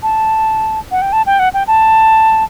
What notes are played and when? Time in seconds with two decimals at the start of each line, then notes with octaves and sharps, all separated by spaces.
0.03 A5
0.91 F#5
1.02 G5
1.13 A5
1.26 G5
1.39 F#5
1.54 G5
1.67 A5